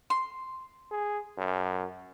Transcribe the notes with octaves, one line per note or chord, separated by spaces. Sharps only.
C6
G#4
F#2